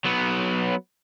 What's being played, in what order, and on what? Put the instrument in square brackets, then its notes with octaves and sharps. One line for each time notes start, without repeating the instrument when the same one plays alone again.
[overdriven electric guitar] F#3 B3